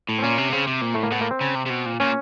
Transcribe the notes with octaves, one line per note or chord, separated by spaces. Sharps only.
A2
C4
A#2 C#4
C3
C#3 C4
C3
A#2
A2 A3
A#3
A2 B3
A#3
C4
C#3
C3
C3
B2
A#2
A#2 C#4